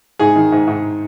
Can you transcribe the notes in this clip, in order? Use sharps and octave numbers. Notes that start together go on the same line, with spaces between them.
G#2 G#4
D#3
G#2
G#2